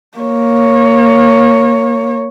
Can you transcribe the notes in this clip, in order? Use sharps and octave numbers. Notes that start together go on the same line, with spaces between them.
A#3 C#5